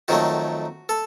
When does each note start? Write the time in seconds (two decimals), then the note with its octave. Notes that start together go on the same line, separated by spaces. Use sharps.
0.08 F2 D#3 F#3 A3 F#4
0.89 A4